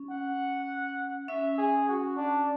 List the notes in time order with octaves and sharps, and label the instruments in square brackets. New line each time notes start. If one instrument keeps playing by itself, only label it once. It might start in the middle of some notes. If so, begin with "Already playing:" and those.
Already playing: [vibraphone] C#4
[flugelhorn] F#5
[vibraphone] C#4 [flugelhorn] E5
[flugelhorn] G#4
F#4
D4